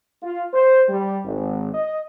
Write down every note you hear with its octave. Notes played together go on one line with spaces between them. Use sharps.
F4
C5
G3
G#1
D#5